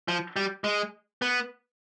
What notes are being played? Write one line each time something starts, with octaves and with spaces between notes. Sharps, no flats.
F3
G3
G#3
B3